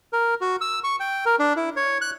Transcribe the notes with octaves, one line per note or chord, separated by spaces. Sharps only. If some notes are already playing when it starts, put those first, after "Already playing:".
A#4
F#4
E6
C#6
G5
A#4
D4
E4
C#5
F#6